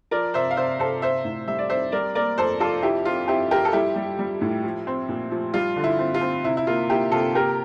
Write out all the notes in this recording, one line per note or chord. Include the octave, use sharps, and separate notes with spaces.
F3 A#4 D5
C3 C5 E5
F5
C3 C5 E5
C3 A4 C5
C4 C5 E5
A2
G3 E5
D5
C4 C5 E5
G3 A#4 D5
A#3 A#4 D5
F2 A4 C5
F2 F4 A4
F3 E4 G4
C4 F4
C4 E4 G4
F3 G4 A#4
A4
G3 E4 G4
G3
G3
A2
F3
C4
A#2
F3
G3 F4
D3
E4
C4
F4
C4
C3 E4
E4
A#3 F4
A#3 E4 G4
C3 F4 A4
A#3 G4 A#4